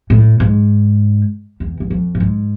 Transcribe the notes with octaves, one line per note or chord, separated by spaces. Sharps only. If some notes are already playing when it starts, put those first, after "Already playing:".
A2
G#2
E2
E2
F2
A2
G#2